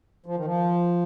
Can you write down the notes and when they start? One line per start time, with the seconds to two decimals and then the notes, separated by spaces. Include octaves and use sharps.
0.26 F3
0.36 D#3
0.45 F3